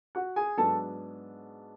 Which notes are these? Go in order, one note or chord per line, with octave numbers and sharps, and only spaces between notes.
F#4 F#5
G#4 G#5
G#2 F#3 B3 D4 A4 A5